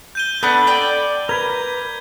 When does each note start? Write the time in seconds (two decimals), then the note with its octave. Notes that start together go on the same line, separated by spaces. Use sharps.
0.15 G6 D#7 G7
0.43 B3 D4 A4 B5
0.67 D5 G5
1.29 A#4 B4 G#6